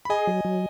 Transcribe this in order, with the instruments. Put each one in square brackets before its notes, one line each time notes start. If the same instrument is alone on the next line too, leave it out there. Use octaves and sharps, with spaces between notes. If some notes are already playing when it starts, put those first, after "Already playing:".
[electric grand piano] B5
[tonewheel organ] G#4 [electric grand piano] D#5 G#5
[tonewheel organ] F#3
F#3